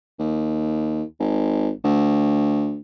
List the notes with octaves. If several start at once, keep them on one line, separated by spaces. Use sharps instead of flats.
D#2
G#1
D2